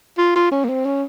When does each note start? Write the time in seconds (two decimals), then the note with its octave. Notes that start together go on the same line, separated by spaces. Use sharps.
0.18 F4
0.35 F4
0.51 C#4
0.65 A#3
0.69 C4
0.86 C#4